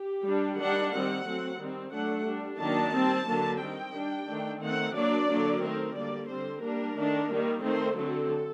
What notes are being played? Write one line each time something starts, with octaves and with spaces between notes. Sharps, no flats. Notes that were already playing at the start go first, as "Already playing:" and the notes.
Already playing: G4
G3 D4
D#3 G3 D4 F#5
D#3 G3 C4 F#5
F#3 A3 C4
D#3 G3 C4
F#3 A3 D4 F#5
G3 D4
D#3 F#3 A#3 D4 A5
G3 C4
D3 F#3 A#3 D4
D#3 G3 C4 G5
G3 D4
D#3 A3 D4
D#3 A3 C4 F#5
F#3 A#3 D4 D5
D3 F#3 A#3 D4
D#3 A3 C4 A#4
D3 G3 A#3 D5
D3 G3 C4 C5
G3 A#3 D4 A#4
D#3 A3 D4
D#3 G3 A#3
D#3 A3 C4 C5
D3 F#3 A3 C4 A4